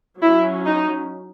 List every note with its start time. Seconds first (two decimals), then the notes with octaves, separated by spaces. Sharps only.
0.21 F#3 C#4 E4
0.65 D#4